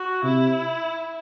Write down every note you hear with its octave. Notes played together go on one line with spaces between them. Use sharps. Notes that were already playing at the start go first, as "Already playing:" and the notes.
Already playing: F#4
C3 E4